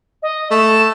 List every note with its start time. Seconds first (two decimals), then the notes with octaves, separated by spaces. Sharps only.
0.22 D#5
0.51 A3 E7